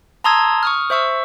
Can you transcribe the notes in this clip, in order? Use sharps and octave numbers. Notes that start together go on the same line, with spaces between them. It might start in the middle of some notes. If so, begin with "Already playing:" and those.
A5 A#5 C6 D#6 E6 G#6
C#6 D#6 F6
C5 E5 C#6 E6